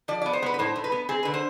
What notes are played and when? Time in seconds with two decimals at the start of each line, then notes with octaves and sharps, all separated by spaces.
0.08 F3 D5
0.22 D5
0.26 B3
0.33 C5
0.42 B3 B4
0.54 B4
0.59 A2 C5
0.76 A2
0.84 B4
0.92 B3
1.09 C4 G#4
1.23 D3 B4
1.34 C5